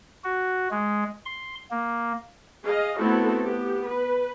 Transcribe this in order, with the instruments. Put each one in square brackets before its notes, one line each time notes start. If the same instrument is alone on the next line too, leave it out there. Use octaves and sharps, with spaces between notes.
[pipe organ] F#4
G#3
C6
A#3
[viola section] G#4 D#5 F5
A3 B3 C4 E4 F#4 A4
B3 G4
B4